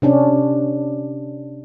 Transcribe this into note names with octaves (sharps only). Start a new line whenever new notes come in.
C3 C#4 D4